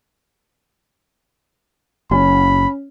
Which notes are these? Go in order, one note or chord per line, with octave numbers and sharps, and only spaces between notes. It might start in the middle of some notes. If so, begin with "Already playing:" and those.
F#1 C#4 B5